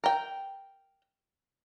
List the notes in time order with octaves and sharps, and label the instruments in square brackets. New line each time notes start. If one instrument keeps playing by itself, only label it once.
[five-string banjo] A#4 G5